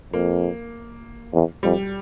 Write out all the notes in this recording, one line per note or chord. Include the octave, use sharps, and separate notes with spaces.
F2 A#3
E2
F2 G3